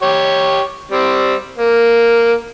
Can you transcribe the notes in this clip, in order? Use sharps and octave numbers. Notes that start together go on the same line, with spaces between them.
G4 C#5
G3 C4
A#3